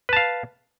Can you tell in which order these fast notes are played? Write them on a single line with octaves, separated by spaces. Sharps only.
B4 A5 F5